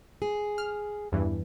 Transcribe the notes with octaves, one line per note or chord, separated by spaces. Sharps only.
G#4
F6
E2 G2 E3